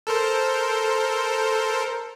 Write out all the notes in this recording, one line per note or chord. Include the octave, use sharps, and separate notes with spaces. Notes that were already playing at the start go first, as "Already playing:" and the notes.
A4 A#4 C5